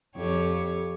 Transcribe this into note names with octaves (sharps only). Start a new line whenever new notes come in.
F2 G4 C#5